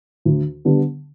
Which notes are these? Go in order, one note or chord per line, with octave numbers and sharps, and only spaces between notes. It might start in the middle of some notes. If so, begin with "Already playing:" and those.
D2
D3 G3 B3